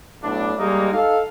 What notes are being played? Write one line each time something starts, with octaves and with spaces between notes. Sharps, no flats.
B1 A2 D4
G3 G#3 A#3 D#4 D#5
D#4 A4 F5